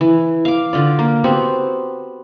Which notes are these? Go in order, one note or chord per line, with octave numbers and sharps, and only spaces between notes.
E3
F5 D6
D3 F4 D5
A#3
B3 C4 F#4 G4